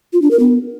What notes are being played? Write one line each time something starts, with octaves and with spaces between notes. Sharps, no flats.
F4
D4
A#4
B3